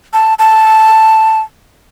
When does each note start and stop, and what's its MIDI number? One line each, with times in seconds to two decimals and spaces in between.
0.13 0.34 81
0.39 1.40 81